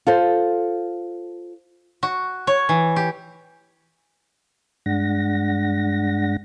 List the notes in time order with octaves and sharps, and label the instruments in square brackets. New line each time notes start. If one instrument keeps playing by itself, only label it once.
[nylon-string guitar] F4 A4 C5
[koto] F#4
C#5
E3
G4
[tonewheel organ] G2 G#3 D4 F#5 A#6